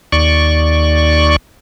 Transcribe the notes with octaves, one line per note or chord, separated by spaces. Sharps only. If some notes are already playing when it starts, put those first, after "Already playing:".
D#2 D5 C#6